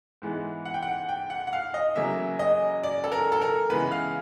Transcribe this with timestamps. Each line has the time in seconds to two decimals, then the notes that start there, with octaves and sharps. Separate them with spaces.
0.22 G#2 E3 G#3 B3
0.65 F#5
0.74 G5
0.83 F#5
1.09 G5
1.30 F#5
1.47 F#5
1.53 F5
1.74 D#5
1.96 E2 C#3 F#3 A#3 E5
2.39 D#5
2.83 D5
3.04 A4
3.12 A#4
3.32 A4
3.42 A#4
3.70 C#3 E3 G#3 B3 B4
3.92 F5